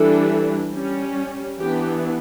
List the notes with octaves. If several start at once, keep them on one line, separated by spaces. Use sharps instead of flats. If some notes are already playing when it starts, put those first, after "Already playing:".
Already playing: E3 G3 D4 A4
G3 C#4
E3 B3 D4 G4